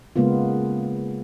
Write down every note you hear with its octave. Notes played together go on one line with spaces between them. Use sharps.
C#3 G#3 A#3 B3 F4